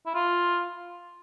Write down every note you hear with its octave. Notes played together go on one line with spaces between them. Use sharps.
E4
F4